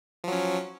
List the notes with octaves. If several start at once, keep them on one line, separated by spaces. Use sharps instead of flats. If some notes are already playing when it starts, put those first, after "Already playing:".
F3 F#3 C#4